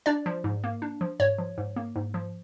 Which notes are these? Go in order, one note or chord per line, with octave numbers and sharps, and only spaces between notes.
D4 D5
F3
G#2
A#3
D4
F3
G#2 C#5
F3
G#2
A#3
G#2
F3